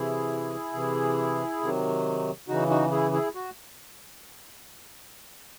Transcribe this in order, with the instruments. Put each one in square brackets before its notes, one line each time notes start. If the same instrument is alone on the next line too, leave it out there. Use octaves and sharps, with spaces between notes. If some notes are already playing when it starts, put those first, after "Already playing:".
Already playing: [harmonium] C3 E3 E4 G#4
C3 E3
C3 D#3 F#3
C#3 E3 D#4 F#4
D#4 F#4
E4 G#4
E4 G#4
F#4